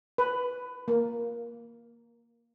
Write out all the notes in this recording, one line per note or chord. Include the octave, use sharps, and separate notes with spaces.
B4
A#3